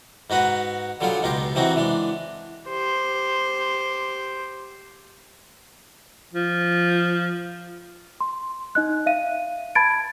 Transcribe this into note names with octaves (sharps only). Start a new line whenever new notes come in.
G#2 D#4 F#4 B4 F#5
D3 F#3 G3 F4 G#4
C#2 B2 D#4 G4 C6
C3 E3 C4 D#4 F#4
E3 G#3 D4
G4 C5
F3
C6
D#4 D#5 F#6
E5 F5 D#7
A5 B5 G#6 A6 D7